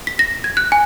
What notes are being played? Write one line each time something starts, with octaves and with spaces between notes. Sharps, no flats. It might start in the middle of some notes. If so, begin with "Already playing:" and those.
B6
A#6
G#6
F#6
G#5